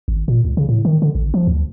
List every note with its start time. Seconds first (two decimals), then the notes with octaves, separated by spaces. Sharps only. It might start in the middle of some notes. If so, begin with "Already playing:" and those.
0.08 G#1
0.28 A#2
0.45 C#2
0.57 C#3
0.69 A2
0.85 D#3
1.02 D3
1.15 A1
1.34 F3
1.47 D2